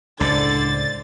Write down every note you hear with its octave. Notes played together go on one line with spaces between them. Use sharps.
C#2 A2 D3 C5 D5 A6